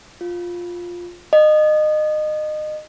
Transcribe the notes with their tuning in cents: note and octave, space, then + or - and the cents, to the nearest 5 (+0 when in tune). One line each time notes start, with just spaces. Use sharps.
F4 +5
D#5 -25